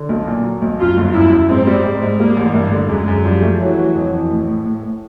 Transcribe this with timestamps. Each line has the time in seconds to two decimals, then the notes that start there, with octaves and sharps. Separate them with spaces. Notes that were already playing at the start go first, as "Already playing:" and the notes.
Already playing: D3
0.09 B1
0.27 A#2
0.44 F#3
0.62 B1
0.79 F#2 F4
0.97 G1
1.14 F#2 E4
1.32 F#2
1.49 G#2 C4
1.67 G3
1.84 G#2
2.02 G#2
2.19 G3 A#3
2.37 A1
2.54 G2 A#3
2.72 D3
2.89 F#2 G#3
3.08 F#2
3.24 F3 G3
3.42 A3
3.60 E3 F#3
3.78 E3
3.95 F2
4.13 E3
4.30 A2
4.48 A2
4.65 A2
4.83 A2